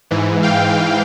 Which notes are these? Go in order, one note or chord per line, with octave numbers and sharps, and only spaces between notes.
G#2 E3
F5 G5